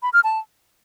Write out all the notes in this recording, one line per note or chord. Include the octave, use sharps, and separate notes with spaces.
B5
F6
A5